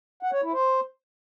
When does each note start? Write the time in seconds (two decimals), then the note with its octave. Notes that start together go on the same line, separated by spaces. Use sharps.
0.23 F#5
0.33 C#5
0.43 E4
0.53 C5